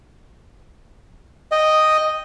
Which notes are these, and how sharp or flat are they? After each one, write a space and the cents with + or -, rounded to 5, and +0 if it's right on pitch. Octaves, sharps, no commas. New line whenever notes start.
D#5 +0 G5 +0